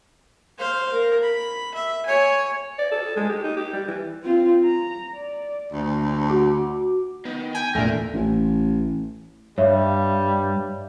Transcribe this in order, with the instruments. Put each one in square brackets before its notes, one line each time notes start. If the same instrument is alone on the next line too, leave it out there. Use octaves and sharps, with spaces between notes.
[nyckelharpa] C5 F5
A#4
B5
E5
C#5 G#5
[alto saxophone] D5
A4
G#3
G4
D#4
G4
G3
E3
[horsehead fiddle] C4 F4
A#5
D5
[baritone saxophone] D2
[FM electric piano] F#4 D6
[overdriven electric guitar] D#3 [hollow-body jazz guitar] B3
[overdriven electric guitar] G5 [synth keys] G#5
[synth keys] E2 A#2 [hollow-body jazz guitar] A3 D4 [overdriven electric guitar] A#4
[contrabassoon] A1
[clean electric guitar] G2 [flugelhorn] G3 [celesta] C#5 E5 F5